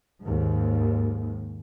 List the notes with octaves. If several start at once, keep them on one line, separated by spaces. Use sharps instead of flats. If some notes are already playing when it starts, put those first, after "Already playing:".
D#2 G#2